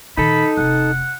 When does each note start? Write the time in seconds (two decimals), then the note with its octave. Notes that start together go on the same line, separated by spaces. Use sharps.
0.17 A#2 D#3 D#4 A4 B5
0.57 F1 C3 F#5